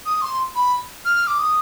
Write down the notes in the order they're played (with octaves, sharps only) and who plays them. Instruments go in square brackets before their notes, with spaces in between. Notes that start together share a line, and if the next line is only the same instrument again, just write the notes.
[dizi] D#6
C6
B5
F6
D6
D#6